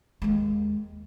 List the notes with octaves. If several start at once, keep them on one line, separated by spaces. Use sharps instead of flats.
D#2 G#3